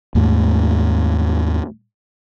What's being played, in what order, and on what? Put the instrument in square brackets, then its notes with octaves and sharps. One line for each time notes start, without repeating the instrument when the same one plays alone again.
[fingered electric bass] D#2 G#2 A3